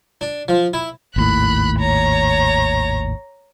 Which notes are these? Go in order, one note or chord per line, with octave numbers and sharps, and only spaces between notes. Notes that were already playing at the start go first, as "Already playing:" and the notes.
D4
F3
E4
G#1 D#2 A2 B5 F#6
C#5 A#5